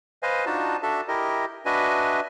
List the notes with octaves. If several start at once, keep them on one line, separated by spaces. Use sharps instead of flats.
B4 C5 D#5 F5 G#5
D4 D#4 F4 F#4 A5
D4 F#4 A4 E5 A5
E4 G4 A#4 D#5
D4 F#4 B4 D#5 E5 G#5